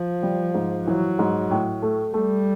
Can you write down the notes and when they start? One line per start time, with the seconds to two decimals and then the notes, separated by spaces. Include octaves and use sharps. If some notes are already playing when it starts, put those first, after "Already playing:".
Already playing: F3
0.23 G3
0.54 G#2
0.87 E3 F#3
1.19 G#2
1.51 A2
1.82 A3
2.14 G3 A3